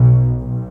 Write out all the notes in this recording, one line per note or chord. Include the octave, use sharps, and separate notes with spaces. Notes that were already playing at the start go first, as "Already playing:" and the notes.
Already playing: B1 B2
B1